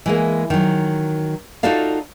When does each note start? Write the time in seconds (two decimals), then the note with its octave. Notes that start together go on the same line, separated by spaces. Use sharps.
0.06 E3 G#3 A#3
0.50 D#3 F#3
1.63 D#4 F4 F#4 A4 D5 F5